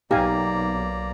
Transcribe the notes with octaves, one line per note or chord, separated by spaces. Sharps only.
B1 A#3 D#4 G4 D5 F5 G#5 A#5